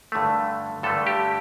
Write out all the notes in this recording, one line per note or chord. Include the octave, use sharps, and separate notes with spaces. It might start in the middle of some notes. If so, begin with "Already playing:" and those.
G2 D3 A3
G2 D3 A3 A4
G4